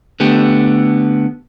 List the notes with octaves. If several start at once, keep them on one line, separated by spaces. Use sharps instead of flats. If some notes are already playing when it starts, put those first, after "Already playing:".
D3 A3 B3 G4